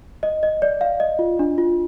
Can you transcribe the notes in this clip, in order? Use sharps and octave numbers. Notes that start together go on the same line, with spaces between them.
D#5
D#5
D5
F5
D#5
F4
D4
F4